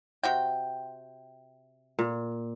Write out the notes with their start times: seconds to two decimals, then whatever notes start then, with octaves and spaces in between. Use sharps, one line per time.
0.23 C3 F#4 G5
1.99 A#2